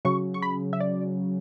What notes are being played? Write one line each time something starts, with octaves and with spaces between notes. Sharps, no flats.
C#3 F#3 C#6
C#6
B5
E5
D5